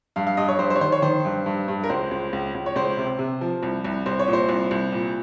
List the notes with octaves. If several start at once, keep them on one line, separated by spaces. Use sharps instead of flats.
G2 F5
F5
G2 D#5
C#5
G2 C5
C5
C#5
D#3 C5
C#5
D#3 C5
G2
G2
G2
A#4
C#2 C5
C#2
C#2
C#2
C#5
C#2 C5
C3
C3
F3
C2
C2
C2 C5
C#5
A#2
C5
C2
C2
A#2